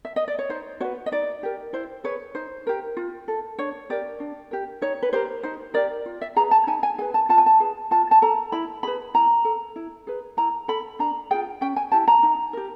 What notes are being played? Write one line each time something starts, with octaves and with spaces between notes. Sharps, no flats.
E5
D#5
D5
C#5
D#4 C5
F#4 B4 C#5
D#5
D#4 D5
G4 A#4
E4 C5
G#4 B4 C#5
D#4 C5
G4 A#4
F4
A4
D4 C#5
G4 A#4 D5
D4
G4 A#4
D#4 C#5
B4
G4 A#4 C5
D#4 C5
G4 A#4 D5
F4
E5
G#4 B4 A#5
A5
D#4 G#5
G#5
G#4 B4 G#5
A5
F4 A5
G#5
A5
G#4 B4
F4 A5
A5
A4 A#5
E4 B5
G#4 B4 B5
E4 A#5
A4
E4
G#4 B4
E4 A#5
A4 B5
D4 A#5
F4 G#4 G5
C#4 G5
G#5
E4 G4 A5
A#5
D#4
G4 A#4